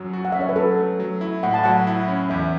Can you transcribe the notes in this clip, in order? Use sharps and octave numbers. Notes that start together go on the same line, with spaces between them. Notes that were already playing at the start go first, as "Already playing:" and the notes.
Already playing: F#2 F#3
F#4
F#5
C#4 E5
C#5
B4
F#3 A4
A3
F#3
E4
A2 F#5
A5
F#3 F#5
E4
C#4
E2 E5